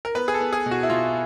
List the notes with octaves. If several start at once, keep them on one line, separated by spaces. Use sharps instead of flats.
A#4
B3 B4
G#4
A4
B3
G#4
B2
F#4
E4
B2 F4